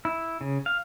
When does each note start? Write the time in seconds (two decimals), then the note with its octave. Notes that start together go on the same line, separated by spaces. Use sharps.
0.05 E4
0.41 C#3
0.66 F5